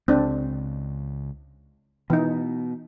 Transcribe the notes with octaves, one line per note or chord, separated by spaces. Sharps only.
C#2 C4 D4
B2 E3 D#4